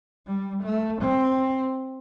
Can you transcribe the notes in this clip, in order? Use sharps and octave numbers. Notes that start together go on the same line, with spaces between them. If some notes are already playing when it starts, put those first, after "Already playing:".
G3
A3
C4